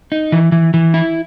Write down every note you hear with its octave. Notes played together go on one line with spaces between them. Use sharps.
D#4
E3
E3
E3
E4